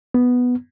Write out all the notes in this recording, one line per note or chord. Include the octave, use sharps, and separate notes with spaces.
B3